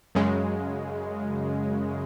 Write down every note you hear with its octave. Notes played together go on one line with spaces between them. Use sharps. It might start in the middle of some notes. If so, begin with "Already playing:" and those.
F#2 C#3 G#3